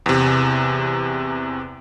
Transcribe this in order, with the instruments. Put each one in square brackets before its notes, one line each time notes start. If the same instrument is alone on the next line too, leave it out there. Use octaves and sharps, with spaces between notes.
[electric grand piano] E2 C3